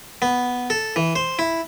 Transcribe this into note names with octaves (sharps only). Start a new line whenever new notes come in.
B3
A4
E3
C5
E4